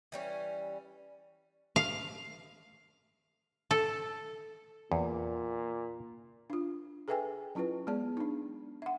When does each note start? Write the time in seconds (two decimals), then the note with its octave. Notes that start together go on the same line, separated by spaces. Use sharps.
0.12 E3 G3 C#4
1.76 F5
3.71 A4
4.92 E2 A#2
6.50 D4 F4
7.08 G#4 A4 B4 E5 G5 G#5
7.55 F#3 C#4 E4 F4 B4
7.87 G#3 B3 G#4 D5 A5
8.17 D4 D#4
8.82 E5 F#5